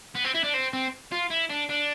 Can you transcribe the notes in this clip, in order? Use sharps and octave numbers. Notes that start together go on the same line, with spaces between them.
B3
C4
E4
D4
C4
C4
F4
E4
D4
D4